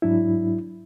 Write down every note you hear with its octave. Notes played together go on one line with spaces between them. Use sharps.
G#2 F#3 D4 E4